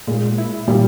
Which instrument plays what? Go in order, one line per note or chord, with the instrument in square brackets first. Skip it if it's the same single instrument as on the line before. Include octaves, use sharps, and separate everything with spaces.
[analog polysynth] A#2 [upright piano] G#3
[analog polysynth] E4
[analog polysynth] A#2 [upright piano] G3